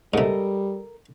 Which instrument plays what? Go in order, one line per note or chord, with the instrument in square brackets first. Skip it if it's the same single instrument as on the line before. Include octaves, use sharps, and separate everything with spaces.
[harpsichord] G#2 C3 [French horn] G3 [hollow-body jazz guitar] A4 A#4 D#5